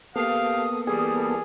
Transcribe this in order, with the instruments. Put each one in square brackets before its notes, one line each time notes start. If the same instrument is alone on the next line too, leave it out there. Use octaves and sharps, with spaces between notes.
[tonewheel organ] A#3 B3 A4 [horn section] G4 F5 [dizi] D#6
[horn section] E3 G3 [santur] G#4 [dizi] D#6